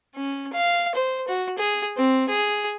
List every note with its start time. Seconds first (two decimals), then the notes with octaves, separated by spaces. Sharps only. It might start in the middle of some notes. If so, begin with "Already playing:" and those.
0.15 C#4
0.53 F5
0.95 C5
1.28 F#4
1.58 G#4
1.97 C4
2.29 G#4